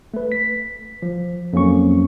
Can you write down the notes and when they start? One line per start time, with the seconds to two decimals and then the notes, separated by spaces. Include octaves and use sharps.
0.14 A3 B4
0.32 B6
1.02 F3
1.53 F2 F#3 A#3 C#4 C#6